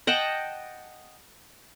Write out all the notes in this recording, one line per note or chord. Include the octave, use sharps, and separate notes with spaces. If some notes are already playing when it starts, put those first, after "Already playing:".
D#5 F#5 G5 A5